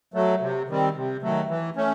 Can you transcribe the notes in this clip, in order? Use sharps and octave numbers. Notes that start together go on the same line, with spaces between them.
F#3 A3
C3
D#3 G3 C4
C3
D#3 F#3 A3
E3
A3 C#4